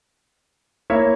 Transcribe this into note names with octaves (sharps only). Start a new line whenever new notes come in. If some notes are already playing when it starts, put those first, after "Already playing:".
A#3 E4 A#4 C#5 E5